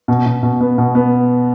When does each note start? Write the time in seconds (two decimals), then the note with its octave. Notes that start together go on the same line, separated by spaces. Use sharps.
0.08 B2
0.26 B2
0.43 B2
0.61 B3
0.78 B2
0.95 B3